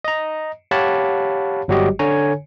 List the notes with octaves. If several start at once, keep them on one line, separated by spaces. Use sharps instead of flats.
D#5 A#5
G4 C#5 F5 F#5 A5 B5
G1 F#3 G3 F#4 G4 D#5
D3 C#5 G#5 A#5